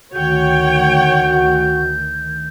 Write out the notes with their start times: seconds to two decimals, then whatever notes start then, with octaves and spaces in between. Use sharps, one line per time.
0.14 D2 D#3 F#4 C#5 G5 G6